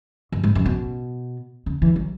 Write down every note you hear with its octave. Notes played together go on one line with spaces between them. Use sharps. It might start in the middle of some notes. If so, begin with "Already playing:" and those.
F#2
G#2
F#2
B2
C#3
E3
F#3